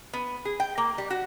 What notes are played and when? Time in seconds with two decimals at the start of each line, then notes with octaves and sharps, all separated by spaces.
0.13 B3
0.45 G#4
0.60 G5
0.78 A#3
0.98 G3
1.10 F#4